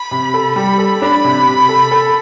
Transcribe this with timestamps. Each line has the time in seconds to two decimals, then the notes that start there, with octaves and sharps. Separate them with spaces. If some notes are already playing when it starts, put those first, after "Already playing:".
Already playing: B5
0.11 C3
0.34 A4
0.55 G3 B5
0.78 A4
1.02 D4 B5
1.24 C3
1.47 C3
1.69 A4
1.91 A4